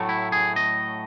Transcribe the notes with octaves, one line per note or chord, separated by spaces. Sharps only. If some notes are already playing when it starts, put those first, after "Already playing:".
Already playing: A2 F#3 A3
E4
G#4
D#5